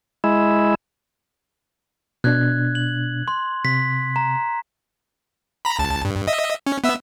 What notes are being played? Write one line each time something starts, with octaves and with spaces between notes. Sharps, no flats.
G#3 E4
B2 D4 F#6 G#6
F#7
C6
C3 B6
A#5
A#5 B5
C#2 A5
G2
D#5 E5
C#4
B3 E5 E6